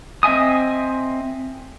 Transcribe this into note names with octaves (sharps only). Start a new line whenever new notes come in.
C4 D#5 E5 G#5 D#6